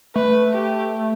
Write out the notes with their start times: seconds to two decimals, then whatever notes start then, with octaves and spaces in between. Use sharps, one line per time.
0.15 A3 B4
0.53 G4